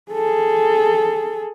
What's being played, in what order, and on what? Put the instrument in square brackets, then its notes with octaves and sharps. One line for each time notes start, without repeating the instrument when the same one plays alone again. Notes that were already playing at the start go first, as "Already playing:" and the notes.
[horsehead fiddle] G#4 A4